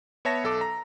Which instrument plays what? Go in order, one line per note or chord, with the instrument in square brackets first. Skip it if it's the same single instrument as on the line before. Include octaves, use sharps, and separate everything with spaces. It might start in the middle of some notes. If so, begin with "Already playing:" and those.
[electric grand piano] B3 C#5 E5 A5 A#6
B1 A4 D6
A#5